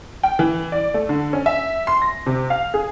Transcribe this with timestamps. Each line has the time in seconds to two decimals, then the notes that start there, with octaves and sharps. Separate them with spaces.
0.23 G5
0.39 E3
0.72 D5
0.94 A3
1.09 D3
1.33 C#4
1.46 E5
1.87 C6
2.02 A#6
2.26 C3
2.50 F5
2.74 G#4